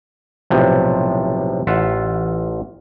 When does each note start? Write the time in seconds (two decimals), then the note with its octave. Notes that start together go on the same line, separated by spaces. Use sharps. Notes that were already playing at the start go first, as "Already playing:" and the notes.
0.50 B1 A2 C3 F3
1.67 A1 F4 E5 F#5